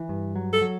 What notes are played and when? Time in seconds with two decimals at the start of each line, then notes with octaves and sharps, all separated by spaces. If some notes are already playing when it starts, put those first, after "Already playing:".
Already playing: E3
0.09 G2
0.36 F#3
0.53 A4
0.62 F#3